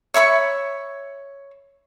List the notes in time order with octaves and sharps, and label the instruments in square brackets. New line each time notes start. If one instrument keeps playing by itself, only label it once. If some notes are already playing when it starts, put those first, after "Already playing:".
[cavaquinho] C#5 E5 B5 C#6